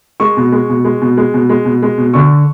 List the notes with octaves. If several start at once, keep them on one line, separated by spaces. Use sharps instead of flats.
G#3 C#6
B2
G#3
B2
G#3
B2
G#3
B2
G#3
B2
G#3
B2
D3 C#6